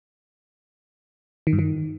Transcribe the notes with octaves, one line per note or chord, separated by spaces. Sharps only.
D#3
G2
D#3